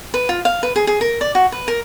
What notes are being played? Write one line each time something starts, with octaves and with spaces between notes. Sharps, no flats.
B4
F4
F5
B4
G#4
G#4
A#4
D5
F#4
B4
A#4